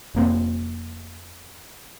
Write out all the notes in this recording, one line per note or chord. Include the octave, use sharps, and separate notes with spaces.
F1 A#3 C4